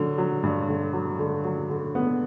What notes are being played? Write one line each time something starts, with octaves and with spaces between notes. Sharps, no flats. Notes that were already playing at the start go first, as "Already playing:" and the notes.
Already playing: D3 F#3
F#3
G2
D3
F#3
D3
F#3
D3
B3